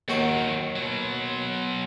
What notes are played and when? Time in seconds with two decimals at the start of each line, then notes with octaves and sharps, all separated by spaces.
0.09 D#2 D#3 F#3 F#4
0.76 B2 F#3